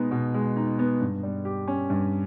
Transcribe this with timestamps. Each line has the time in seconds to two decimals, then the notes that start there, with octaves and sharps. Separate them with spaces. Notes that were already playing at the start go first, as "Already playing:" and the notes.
Already playing: B2 G#3 B3 D#4
0.11 B2
0.34 G#3
0.56 D#4
0.79 B3
1.01 G2
1.23 G3
1.45 G4
1.68 C#4
1.90 G2